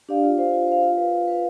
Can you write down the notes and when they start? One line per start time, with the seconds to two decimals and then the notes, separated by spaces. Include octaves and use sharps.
0.09 D4 G4 D5 F5
0.23 F4
0.38 C5 F5
0.53 F4
0.68 C5 F5
0.83 F4
0.97 B4 F5
1.13 F4
1.28 B4 F5